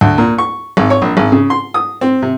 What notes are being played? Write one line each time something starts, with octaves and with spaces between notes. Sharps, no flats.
D2
A#2
C#6
G#1
C#5
A#1
G#1
C#3
C6
D#6
C4
C3